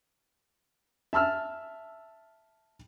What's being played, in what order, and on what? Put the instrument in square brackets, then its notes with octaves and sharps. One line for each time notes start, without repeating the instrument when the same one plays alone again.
[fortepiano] E5 A5 E6 F6